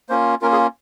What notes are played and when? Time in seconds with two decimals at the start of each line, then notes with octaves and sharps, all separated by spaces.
0.09 A#3 C#4 F4 C5
0.41 A#3 C#4 F4 A#4
0.52 G#4